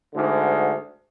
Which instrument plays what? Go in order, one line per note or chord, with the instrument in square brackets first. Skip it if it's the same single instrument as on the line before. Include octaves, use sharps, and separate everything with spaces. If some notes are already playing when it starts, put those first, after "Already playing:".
[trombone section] D2 G#2 D3